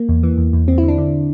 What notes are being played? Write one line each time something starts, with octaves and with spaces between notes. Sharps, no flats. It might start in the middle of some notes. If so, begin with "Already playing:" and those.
Already playing: A#3
E2
E3
E2
E2
E2 C4
E4
D3
D4
D3